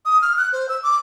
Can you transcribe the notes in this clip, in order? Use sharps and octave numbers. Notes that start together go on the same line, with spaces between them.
D#6
F6
F#6
C5
E6
D6